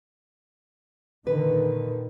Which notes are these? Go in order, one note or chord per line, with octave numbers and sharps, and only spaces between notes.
A#2 D3 D#3 B4